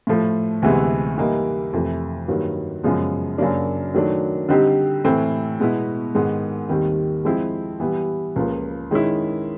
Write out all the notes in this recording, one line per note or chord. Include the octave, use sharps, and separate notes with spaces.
A2 F3 A3
D2 C3 E3 G#3 B3
E3 G3 A#3 D#4
F2 C3 E3 A3
G2 D#3 F#3 A#3
F#2 C#3 F3 G#3 B3
F#2 C#3 F#3 A#3 D4
D#3 F#3 A3 D4
D3 G3 C4 D#4 G4
A2 E3 A3 C4
B2 G#3 B3 E4
G#2 D#3 G#3 B3
D#2 D#3 G3 C4
F3 G#3 C4 E4
E3 G3 B3
C#2 C#3 F3 A#3
D#3 G#3 C#4 E4